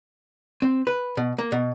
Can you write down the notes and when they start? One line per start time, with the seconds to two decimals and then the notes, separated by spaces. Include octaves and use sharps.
0.62 C4
0.87 B4
1.17 B2
1.38 A#3
1.52 B2